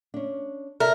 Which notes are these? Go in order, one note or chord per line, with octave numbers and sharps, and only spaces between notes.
C#4 D4
A4 A#4 D5 E5